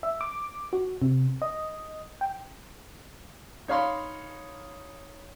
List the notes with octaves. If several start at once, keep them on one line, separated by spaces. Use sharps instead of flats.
E5
D6
F#4
C3
D#5
G5
D#4 C#5 F5 B5 C6